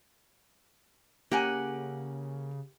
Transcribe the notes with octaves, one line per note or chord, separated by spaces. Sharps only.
C#3 A#3 G4 F#5 G#5